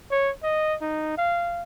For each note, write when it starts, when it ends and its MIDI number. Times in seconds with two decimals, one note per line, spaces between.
0.11 0.31 73
0.43 0.76 75
0.81 1.14 63
1.17 1.63 77